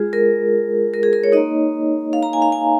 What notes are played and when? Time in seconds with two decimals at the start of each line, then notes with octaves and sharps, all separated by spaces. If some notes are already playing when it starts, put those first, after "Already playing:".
Already playing: G#3 F4 G#4
0.13 A#4
0.94 A#4
1.03 G#4
1.13 A#4
1.24 C#5
1.32 A#3 D#4 D#5
2.13 F5
2.23 A#5
2.33 G#5
2.42 F5
2.52 G#5